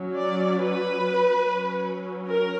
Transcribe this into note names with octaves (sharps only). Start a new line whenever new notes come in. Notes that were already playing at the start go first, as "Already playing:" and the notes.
Already playing: F#3 C#4
D5
B4
F#3 C#4
A#4